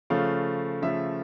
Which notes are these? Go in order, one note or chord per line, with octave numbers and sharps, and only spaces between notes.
C#3 F3 A3 F5
C#3 F3 A3 E5